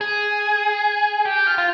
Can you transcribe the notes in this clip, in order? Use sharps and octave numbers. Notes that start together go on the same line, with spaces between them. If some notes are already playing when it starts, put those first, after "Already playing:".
G#4
G4
F4
F4